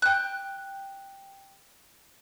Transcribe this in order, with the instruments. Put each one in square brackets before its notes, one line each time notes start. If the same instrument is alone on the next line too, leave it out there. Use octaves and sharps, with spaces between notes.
[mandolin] G5 F#6